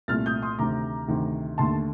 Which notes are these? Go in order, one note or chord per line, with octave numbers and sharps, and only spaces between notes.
C2 A#2 A3 F6 A6
D#6 G6
C6 D#6
D2 C3 D#3 A#5 D6
D2 C3 D#3
D#2 D3 A3 A5 C6